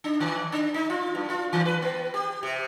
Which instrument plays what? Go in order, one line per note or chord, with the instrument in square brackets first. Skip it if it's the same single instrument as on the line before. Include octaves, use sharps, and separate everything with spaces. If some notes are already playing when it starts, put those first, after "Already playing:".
[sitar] D4
D#3
D4
D#4
F4
G2
F4
D#3
B4
B3
G4
C3